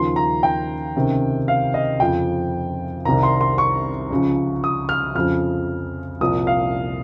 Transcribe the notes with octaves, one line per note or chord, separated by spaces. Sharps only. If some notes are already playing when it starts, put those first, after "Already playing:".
Already playing: D#2 C#3 F3 C6
A#5
G5
C#2 C3 D#3
F5
D#5
F2 C#3 F3 G5
C2 C3 D#3 A#5
C6
C6
C#6
C#2 C#3 F3
D#6
F6
F2 C#3 F3 F6
C2 A#2 F3 D#6
F5